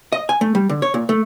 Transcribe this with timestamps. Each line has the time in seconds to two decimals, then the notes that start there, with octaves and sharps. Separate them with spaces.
0.12 D#5
0.29 G#5
0.41 A3
0.55 G3
0.69 D3
0.82 C#5
0.94 A#2
1.09 A3